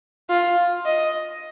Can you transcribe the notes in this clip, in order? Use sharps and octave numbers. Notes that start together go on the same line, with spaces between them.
F4
D#5